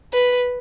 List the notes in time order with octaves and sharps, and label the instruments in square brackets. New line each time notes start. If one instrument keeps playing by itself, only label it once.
[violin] B4